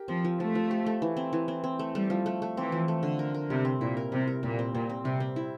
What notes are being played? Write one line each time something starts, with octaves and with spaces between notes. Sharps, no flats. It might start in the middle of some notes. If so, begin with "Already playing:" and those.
Already playing: G4 A#4
F3 C4
F3
F3 A3
F3
G4
A3
E3
C4
E3
C4
C4
A3
G3 A3
F3
A3
A3
E3 C4
F3
A3
D3
A#4
A#4
C3 G3
C4
A#2 E4
A#4
C3 G3
A#4
A#2 G3
C4
A#2 C4
C4
C3 G3
C4
E4